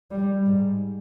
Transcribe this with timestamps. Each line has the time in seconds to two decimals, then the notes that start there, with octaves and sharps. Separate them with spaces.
0.11 G3
0.47 G#2